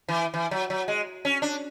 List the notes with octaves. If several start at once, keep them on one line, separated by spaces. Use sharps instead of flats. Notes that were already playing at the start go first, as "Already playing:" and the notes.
E3
E3
F#3
F#3
G#3
C#4
D4